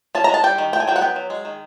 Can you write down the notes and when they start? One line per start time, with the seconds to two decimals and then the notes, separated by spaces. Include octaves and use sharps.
0.15 C#4 A5
0.24 A#5
0.29 G#3 A5
0.44 G3 G5
0.58 D#3
0.73 A3 G5
0.80 G#5
0.88 F#3 G5
0.96 F#5
1.01 B3 G5
1.16 F#3
1.30 G#3
1.45 D#3